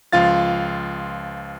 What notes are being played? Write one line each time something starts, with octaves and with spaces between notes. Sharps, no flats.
C#2 F3 F4 F5 A6